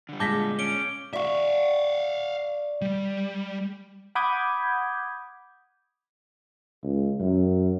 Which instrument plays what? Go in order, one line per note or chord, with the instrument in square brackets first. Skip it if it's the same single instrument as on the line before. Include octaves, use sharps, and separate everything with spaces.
[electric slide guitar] D3 G3
[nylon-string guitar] A#2 G#3 [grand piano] A5 A#6 B6 [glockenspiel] D6 G6 G7
[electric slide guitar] C#4 [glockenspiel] D7 G7
[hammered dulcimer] D5 C#6 [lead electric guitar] E5 F5
[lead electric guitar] G3
[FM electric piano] F#5 B5 D6 D#6 G6 G#6
[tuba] C#2
F#2